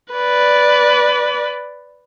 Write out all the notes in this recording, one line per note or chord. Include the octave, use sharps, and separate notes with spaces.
B4 D5